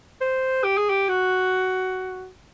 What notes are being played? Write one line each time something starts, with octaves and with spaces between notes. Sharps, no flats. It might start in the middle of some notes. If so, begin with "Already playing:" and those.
C5
G4
G#4
G4
F#4